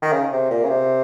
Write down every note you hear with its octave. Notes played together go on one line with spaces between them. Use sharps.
D#3
C#3
C3
A#2
C#3
C3